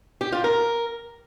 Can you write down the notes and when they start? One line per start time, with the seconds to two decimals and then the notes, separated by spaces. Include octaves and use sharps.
0.21 G4
0.32 F4
0.44 A#4